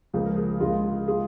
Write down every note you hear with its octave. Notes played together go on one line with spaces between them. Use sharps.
C#2 C#3 F3 A#3 G#4
A#4
G#4
C#2 C#3 G#3 F4
G#3 F4 G#4